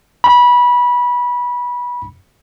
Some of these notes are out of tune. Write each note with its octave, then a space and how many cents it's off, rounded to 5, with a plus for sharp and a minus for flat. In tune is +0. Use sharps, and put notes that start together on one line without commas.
B5 -20